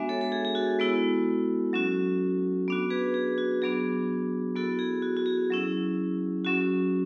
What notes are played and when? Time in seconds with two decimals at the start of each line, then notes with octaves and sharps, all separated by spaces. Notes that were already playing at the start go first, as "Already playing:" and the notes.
Already playing: G#3 B3 D4 F#4 E5 G#5
0.09 A4 C#5
0.21 A4
0.32 G#4
0.45 G#4
0.55 F#4 A4
0.79 G#3 B3 E4
1.73 F#3 C#4 F#4
2.68 B3 D4 F#4
2.90 G#4 B4
3.14 G#4
3.38 F#4
3.62 F#3 B3 D4 F#4 G#4
4.56 B3 E4 F#4 A4
4.79 G#4
5.02 F#4
5.17 F#4
5.26 G#4
5.51 F#3 C#4 E4
6.44 F#3 C#4 F#4